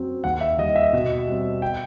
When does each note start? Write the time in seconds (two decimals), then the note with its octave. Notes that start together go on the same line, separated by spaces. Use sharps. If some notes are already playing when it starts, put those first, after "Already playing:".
Already playing: F#2 F#3 C4
0.24 D#2 F#5
0.41 E5
0.58 D#3 G3 D#5
0.76 E5
0.93 B2
1.28 G3 C4
1.62 G5